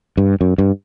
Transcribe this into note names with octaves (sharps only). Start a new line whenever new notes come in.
G2
F#2
G2